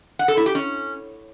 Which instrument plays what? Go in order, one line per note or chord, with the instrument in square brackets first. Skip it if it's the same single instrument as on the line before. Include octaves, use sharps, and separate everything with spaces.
[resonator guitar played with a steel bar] F#5
A4
E4
G4
C#4